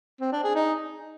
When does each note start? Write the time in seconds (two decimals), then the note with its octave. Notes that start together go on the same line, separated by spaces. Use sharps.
0.21 C4
0.32 D4
0.44 G#4
0.55 D#4